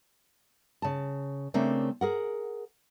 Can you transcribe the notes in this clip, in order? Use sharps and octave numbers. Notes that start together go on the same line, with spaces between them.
C#3 A5
C#3 A3 A#3 C4 D4
G#4 A#4 F#5